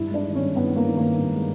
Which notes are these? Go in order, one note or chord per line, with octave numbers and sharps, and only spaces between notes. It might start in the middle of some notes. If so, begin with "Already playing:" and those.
Already playing: G2 E4
G#3 D4
D#3
C#4
G2
G2 B3
G#3
A#3
D#3
G2 A#3
G2
G#3